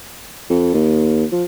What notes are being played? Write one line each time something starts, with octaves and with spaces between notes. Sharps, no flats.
F2
D#2
F3